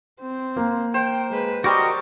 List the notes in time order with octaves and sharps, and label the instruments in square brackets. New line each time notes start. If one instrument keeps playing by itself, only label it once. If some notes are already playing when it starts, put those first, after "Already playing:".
[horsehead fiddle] C4 C5
[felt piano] A#3
[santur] C5 [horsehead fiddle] G5
[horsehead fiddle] G#3 B4
[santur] G3 C#6 D6 [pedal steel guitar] F#4 A#4 D#5 [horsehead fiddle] C5